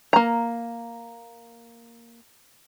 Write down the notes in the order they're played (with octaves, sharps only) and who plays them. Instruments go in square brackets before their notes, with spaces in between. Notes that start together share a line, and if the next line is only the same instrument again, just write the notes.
[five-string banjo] A#3 A#5